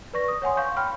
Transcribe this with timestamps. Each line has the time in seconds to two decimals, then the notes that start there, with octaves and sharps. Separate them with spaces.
0.13 B4 D5 C#6 A#6
0.28 D#6
0.42 C#5 F#5 G#5 C6
0.57 F5 C#6 G6
0.77 G5 B5 F6